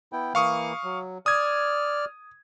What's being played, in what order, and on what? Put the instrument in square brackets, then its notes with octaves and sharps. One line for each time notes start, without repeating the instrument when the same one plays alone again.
[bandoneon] B3 E4 G5
[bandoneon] E3 A#3 [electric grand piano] F5 C#6 D#6
[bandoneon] F#3
[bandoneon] D5 F6 [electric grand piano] D#6 G#6